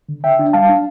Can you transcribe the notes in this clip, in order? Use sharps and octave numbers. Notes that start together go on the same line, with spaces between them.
D3
D3 E5 G5
D4
G3 F5 A5
D4